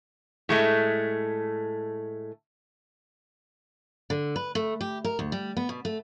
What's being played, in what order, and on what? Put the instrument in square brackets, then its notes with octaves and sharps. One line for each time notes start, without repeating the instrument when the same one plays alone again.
[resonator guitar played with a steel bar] A2 G#3 A3
[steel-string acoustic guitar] D3
B4
A3
G4
A#4
D2
G3
B3
B2
A3